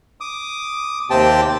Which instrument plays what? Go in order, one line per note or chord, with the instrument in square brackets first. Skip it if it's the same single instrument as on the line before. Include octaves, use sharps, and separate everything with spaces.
[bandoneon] D6 D#6
D#2 C3 C4 G4 G5 A5